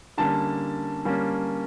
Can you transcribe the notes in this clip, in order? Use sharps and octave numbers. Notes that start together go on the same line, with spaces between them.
D3 G3 A#3 C#4 A5
D3 G3 A#3 C#4